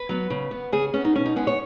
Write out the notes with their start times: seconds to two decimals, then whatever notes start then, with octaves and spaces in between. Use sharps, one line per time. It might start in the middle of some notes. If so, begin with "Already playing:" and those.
Already playing: B4
0.09 F#3 B3
0.30 C#3
0.51 B3
0.72 C#3 G#4
0.94 B3 C#4
1.05 D#4
1.15 B2 C#4
1.26 D#4
1.36 G#3 B3 G#4
1.47 C#5